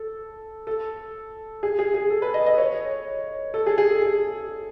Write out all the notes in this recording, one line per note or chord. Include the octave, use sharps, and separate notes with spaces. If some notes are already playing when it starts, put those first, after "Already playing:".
Already playing: A4
A4
G#4
G#4
G#4
A4
B4
D#5
D#5
C#5
A4
G#4
G#4
A4
G#4